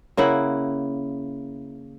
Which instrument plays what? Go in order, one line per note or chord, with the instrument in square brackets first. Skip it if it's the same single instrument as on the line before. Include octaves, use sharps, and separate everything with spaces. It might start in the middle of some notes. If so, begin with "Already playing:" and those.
[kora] C#3 A#3 E4 F#5